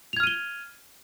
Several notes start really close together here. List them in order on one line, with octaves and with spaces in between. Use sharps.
F7 G#6 F6 D#7 G7